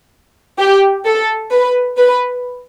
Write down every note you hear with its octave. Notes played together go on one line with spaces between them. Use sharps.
G4
A4
B4
B4